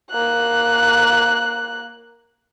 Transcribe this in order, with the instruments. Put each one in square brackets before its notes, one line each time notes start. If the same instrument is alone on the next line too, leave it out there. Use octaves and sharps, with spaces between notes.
[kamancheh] A#3 F#6